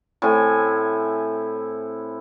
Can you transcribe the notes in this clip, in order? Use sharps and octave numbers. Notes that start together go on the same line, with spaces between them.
A2 C4 E4 G#5